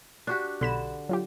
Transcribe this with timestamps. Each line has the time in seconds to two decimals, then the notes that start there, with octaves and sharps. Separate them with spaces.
0.27 D4 F#4 G4
0.61 B1 D3 B5 E7
1.09 F#3 F4 G4